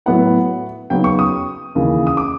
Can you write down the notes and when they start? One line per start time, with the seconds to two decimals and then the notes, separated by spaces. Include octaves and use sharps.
0.06 A2 F#3 B3 E4 F#5
0.90 C#3 F#3 B3 D#4 G5
1.04 C#6
1.19 D#6
1.75 D#2 C#3 E3
2.07 D#6
2.17 D6